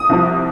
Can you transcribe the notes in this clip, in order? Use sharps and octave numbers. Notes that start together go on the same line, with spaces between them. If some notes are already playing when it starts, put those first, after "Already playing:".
Already playing: D#6
C2 C3 F3